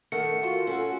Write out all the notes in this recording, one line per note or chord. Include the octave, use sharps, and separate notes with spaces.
D#3 A3 F#5 C#7
F4 F#4 A4
C#4 F#4 A4